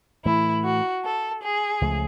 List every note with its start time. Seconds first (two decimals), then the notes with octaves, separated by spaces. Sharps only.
0.25 A2 E3 A3 E4
0.64 F#4
1.04 A4
1.42 G#4
1.81 C#2 C#3 F3 A3